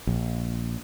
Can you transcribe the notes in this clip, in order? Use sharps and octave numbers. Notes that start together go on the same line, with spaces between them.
A#1